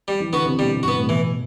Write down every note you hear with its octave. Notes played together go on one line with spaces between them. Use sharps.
G3
E3
D3 B3 F#4
C3
B2 G3
G2 B3 F#4
A2
B2 E3